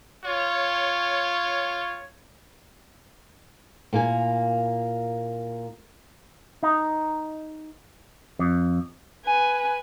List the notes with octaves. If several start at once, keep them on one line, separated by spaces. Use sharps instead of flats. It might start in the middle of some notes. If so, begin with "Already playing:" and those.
F4 C#5
A#2 A#3 E4 G#5
D#4
F2
B4 G#5